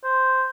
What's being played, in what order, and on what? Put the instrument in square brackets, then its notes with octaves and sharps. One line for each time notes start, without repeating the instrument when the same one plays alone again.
[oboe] C5